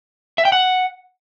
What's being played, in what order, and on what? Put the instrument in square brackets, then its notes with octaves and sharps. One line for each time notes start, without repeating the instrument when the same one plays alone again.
[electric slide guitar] E5
G5
F#5